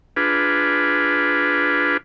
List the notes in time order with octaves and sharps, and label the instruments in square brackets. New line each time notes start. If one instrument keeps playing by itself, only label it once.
[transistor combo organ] D4 F4 G#4 B4